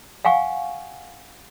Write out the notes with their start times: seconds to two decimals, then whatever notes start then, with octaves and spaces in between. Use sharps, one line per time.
0.25 F5 F#5 G#5 C#6